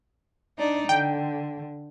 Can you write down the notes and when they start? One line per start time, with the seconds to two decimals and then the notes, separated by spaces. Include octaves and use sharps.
0.58 D4 D#4 D5
0.89 D3 G5